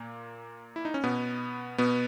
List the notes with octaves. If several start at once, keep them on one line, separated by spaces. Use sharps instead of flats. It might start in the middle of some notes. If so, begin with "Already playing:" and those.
Already playing: A#2 A#3
E4
D#4
C#4
B2 B3
B2 B3